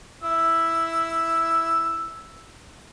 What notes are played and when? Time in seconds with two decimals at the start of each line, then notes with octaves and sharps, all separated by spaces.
0.23 E4 E6